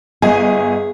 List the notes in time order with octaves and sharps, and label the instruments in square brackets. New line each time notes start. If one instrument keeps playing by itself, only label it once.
[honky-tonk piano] G1 D#5 G#5 [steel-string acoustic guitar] G#4